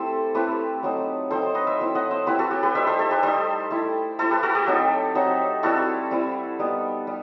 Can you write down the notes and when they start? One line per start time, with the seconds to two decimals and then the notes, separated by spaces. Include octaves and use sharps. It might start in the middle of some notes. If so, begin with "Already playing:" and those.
Already playing: A3 C4 E4 G4 A4 C5
0.35 A3 C4 E4 G4 B4
0.83 F#3 C4 D#4
1.30 F#3 C4 D#4 A4 C5
1.55 B4 D#5
1.67 C5 E5
1.79 F#3 C4 E4
1.95 D#5 F#5
2.11 C5 E5
2.27 F#3 C4 E4 G4 B4
2.39 F#4 A4
2.51 G4
2.63 G4 B4
2.74 G3 D#4 C5 E5
2.87 A4 C5
2.99 A4 C5
3.11 G4 B4
3.23 G3 D#4 A4 C5
3.70 A3 E4
4.19 A3 E4 A4 C5
4.30 G4 B4
4.43 F#4 A4
4.55 G4
4.67 F#3 C4 D#4
5.15 F#3 C4 D#4
5.63 G3 C4 E4 F#4 A4
6.11 G3 C4 E4
6.59 G3 B3 D#4
7.07 G3